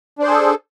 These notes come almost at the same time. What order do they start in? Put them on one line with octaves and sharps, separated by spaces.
D4 C5 G#4 A4